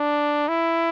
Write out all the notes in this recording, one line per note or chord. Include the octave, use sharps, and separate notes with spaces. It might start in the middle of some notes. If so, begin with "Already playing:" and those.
Already playing: D4
E4